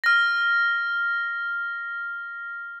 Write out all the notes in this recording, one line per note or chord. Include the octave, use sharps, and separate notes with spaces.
F6 A#6